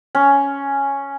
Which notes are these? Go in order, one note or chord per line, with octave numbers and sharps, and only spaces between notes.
C#4